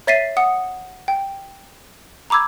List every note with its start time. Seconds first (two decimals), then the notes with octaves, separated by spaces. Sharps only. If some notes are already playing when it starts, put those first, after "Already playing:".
0.07 C#5 E5 A6 B6 C7 D#7
0.37 F#5 D#6 C#7
1.08 G5
2.30 A#5 B5 D6 E6 G#6